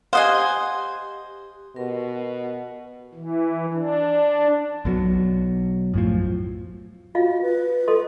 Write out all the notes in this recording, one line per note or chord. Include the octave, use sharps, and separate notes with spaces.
G4 C5 D#5 F5 F#5 G#5 D#6
B2 A#4
E3
D4
B1 B2 F3 F#3
F#2 A2 F3
F4 F#4 D#5 F5
B4
A4 D#5 C6